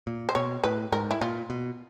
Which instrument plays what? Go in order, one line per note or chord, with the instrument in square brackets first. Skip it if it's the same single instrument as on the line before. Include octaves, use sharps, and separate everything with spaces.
[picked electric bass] A#2
[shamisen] C5
[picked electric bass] B2 [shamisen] C#5
[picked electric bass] A2 [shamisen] B4
[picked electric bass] G#2 [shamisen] A#4
[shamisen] E4
[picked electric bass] A#2 [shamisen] F4
[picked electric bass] B2